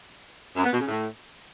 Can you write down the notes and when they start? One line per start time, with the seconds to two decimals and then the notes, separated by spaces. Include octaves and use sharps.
0.56 F#2
0.64 B3
0.72 B2
0.80 C#3
0.88 A2